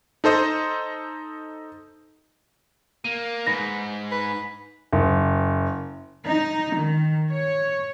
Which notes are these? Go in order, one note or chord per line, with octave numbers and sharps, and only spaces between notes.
D#4 A4 C5 D#5
A#3 D#7
G#2 B4 A#6
B4
F#1
D#4
D#3
C#5